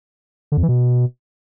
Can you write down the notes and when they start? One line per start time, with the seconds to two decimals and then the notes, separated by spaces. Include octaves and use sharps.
0.52 D3
0.57 F2
0.63 E3
0.69 B2